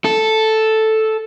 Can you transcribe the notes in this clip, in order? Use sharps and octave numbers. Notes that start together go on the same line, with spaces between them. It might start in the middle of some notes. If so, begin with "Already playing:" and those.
A4